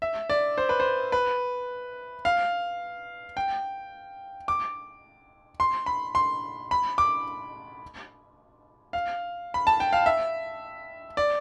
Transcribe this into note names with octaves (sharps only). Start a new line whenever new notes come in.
E5
D5
C5
B4
C5
B4
F5
G5
D6
C6
B5
C6
B5
D6
F5
B5
A5
G5
F5
E5
D5